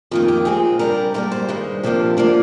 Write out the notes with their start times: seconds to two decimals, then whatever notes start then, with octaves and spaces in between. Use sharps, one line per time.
0.11 F2 D#3 A#3 F4
0.28 G4
0.45 A#2 G#3 C4 G#4
0.79 C3 G3 D4 A#4
1.14 G#2 G3 A#3 A#4
1.31 C5
1.48 G2 D#3 G#3
1.83 C3 F3 A#3 D4
2.17 D3 F3 A#3 D4 D5